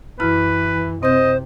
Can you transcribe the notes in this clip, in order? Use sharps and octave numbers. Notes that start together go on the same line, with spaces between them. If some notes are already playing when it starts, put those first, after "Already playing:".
F#2 E3 E4 B4 F6
C3 C4 C5 D#5 G6